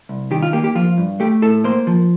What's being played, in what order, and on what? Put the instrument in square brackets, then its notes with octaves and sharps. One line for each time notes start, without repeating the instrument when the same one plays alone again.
[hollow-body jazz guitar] C2
D#3 G4
F4
A#3 G4
G4
F3 F4
G2
A3 G4
A2 A4
A#3 C5
F3